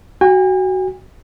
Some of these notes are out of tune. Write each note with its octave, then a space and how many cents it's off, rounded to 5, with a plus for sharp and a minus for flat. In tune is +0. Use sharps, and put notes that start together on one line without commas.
F#4 +15 G#5 -45